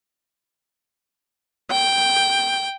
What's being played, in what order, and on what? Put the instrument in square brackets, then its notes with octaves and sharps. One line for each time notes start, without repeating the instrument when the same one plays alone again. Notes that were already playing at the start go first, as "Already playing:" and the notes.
[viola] G5